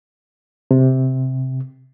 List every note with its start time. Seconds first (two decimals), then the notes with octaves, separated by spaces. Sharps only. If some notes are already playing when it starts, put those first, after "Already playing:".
0.71 C3